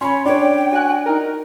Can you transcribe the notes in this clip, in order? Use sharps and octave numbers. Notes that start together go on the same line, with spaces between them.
C#4 C#5 B5 C6
D4 C#5 D5 G5
F#4 G#5 F#6
D#4 A#4